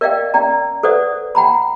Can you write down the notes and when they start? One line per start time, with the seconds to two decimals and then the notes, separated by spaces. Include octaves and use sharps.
0.01 A#4 D5 D#5 F5 G5
0.34 C#4 D5 G5 A#5
0.83 A4 B4 C5 D5 F#5 D#6
1.35 F#5 G5 A#5 B5